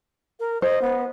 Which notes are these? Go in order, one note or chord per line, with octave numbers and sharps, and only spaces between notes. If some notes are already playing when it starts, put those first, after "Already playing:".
A#4
C5 D#5
B3